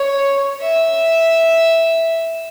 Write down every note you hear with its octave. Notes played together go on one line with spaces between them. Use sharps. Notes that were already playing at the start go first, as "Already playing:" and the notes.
Already playing: C#5
E5